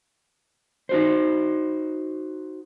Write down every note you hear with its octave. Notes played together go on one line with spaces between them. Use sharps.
D#4 F#4 C5